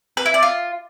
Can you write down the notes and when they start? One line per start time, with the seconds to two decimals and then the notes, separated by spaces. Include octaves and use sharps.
0.17 B4
0.26 E4
0.34 D5
0.43 F4